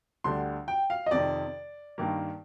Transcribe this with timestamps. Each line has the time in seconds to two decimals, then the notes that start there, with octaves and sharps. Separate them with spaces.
0.24 D2 D3 G3 D4 C6
0.68 G5
0.90 F5
1.06 D#5
1.11 F2 C3 D#3 D5
1.98 G2 D#3 A#3